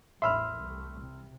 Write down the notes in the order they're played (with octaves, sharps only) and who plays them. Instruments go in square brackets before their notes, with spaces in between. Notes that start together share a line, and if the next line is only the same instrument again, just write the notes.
[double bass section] A1 E2 [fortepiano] E5 B5 [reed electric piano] C6 E6 F6
[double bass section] C2 A3
C3